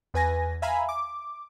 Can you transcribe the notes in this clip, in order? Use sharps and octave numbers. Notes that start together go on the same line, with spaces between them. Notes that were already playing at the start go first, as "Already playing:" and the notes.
E2 B4 G#5 A#6
E5 F5 G#5 A#5 B5
D6